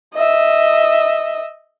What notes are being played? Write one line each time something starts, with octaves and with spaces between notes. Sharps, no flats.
D#5 E5